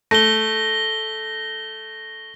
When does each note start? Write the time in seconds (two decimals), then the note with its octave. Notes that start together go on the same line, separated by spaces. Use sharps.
0.11 A3 A#6 G7